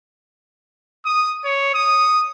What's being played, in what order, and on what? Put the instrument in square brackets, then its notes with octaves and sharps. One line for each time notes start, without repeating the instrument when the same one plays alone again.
[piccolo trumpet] D#6
C#5
D#6